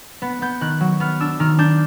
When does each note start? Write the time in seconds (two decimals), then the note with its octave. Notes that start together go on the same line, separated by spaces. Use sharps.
0.22 B3
0.42 B3 G6
0.61 D#3 F#6
0.81 F#3
1.00 B3 F6
1.20 D4 E6
1.40 D#3 F6
1.59 D4 G6